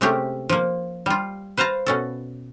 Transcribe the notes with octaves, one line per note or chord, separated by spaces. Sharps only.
C3 G#3 A3 C#4 G4 A#4
F3 A#3
G3 F4
B4 C5 F5 A5 A#5
B2 C#4 A4